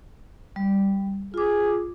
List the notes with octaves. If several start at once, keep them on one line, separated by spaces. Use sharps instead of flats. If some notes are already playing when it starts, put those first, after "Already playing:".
G3
F4 G#4 D6